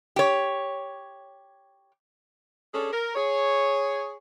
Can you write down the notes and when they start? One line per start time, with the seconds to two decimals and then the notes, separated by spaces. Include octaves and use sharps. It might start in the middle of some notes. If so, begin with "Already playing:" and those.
0.16 G4 C#5
2.74 C#4 D4 G#4 A4
2.92 A#4
3.15 G#4 C#5